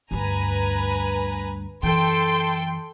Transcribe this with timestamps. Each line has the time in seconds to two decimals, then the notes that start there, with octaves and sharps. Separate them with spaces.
0.11 D2 G2 B4 G#5 A#5
1.83 F#2 E3 A4 G5 C6